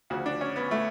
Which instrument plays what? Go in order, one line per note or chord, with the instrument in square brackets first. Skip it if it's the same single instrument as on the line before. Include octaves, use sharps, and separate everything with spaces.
[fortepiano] D2 C#3 F3 F#4
D4
C#4
B3
A3